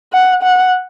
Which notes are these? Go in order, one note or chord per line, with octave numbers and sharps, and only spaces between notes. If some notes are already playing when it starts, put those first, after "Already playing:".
F#5
F#5